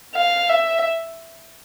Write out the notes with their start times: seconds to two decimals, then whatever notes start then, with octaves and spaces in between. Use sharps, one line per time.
0.15 F5
0.50 E5